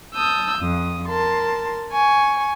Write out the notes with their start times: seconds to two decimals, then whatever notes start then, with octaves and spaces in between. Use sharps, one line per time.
0.14 A5 D#6 E6 G6
0.59 F2 D#6
1.08 A#4 A5 C6
1.92 G#5 C#6